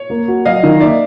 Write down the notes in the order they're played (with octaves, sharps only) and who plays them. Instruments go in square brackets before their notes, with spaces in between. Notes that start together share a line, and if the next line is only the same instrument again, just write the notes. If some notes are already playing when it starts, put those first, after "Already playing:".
Already playing: [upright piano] C#5
[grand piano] A#3
F#4
[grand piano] F#3 [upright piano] D#5 F5
[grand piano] D#3
[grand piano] A#3 [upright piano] D5 E5